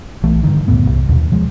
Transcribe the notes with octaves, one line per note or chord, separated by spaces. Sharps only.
B1 E3 A3
G2 D3 D#3
C#2 F#2 A2 B3
C2
D#2 B2
F3 G#3